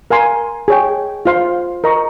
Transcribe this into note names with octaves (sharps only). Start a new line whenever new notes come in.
A#4 F5 G#5 C6
G#4 C#5 G5
F4 C5 F5 C6
A#4 D#5 A#5 C#6